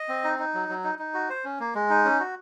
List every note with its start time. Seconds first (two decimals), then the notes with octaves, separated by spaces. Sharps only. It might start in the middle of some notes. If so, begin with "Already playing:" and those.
Already playing: D#5
0.09 C4
0.24 D#4
0.39 D#4
0.54 F#3
0.69 F#3
0.84 D#4
0.99 D#4
1.14 F#4
1.30 C5
1.44 C#4
1.60 A#3
1.75 G#3
1.90 D#4
2.05 C#4
2.20 F#4